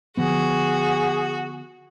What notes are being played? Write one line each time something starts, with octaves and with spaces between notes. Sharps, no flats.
D3 F3 B3 F#4 G#4